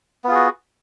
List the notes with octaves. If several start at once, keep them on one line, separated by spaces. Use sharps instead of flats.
B3 F4 F#4 G#4